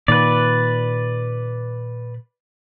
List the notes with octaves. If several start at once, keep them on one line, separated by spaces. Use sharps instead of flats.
A#2 D#3 B4 D5